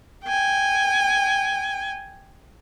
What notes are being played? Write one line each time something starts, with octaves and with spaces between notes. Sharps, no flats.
G5 G#5